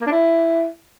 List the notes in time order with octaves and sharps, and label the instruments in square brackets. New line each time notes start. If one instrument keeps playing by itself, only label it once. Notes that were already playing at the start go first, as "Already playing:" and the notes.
[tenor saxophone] A#3
D4
E4